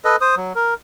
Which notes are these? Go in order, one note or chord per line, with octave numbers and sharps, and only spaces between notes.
A4 B4 D#5
C5 D#6
F#3
A#4